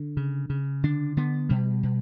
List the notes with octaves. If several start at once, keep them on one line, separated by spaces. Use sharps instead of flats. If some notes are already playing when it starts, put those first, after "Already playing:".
Already playing: D3
C#3
C#3
D3 D4
D3 B3
B2 G3
B2